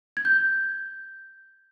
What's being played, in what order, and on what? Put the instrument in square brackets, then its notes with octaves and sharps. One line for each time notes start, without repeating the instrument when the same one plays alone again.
[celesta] G#6
G6